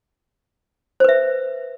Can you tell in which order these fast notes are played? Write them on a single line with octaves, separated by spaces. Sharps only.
C5 B4 E5